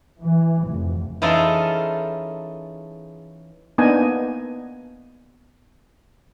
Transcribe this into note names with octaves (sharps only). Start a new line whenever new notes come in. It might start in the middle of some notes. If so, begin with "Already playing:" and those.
E3
F1
E3 C#4 D#4 F4 G#4 A4
A#3 B3 D4 D#4 D#5 G#5